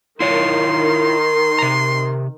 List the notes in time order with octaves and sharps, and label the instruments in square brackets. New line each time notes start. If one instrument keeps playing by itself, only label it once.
[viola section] D#3 [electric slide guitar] E4 F4 C#5 [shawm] C6
[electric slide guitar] C3 A#5